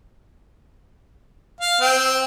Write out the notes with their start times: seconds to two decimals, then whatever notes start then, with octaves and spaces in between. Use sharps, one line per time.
1.61 F5
1.81 C4 G5